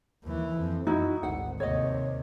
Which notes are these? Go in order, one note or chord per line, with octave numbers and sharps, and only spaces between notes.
D#2 E3
F2
F#2 D#4 E4 F#4
G#1 D2 F#5
D#2 C3 C#5 D#5